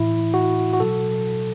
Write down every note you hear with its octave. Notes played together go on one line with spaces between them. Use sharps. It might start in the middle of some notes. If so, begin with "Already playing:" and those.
Already playing: A2 E3 E4
F#4
F#4
B2 F#3 A4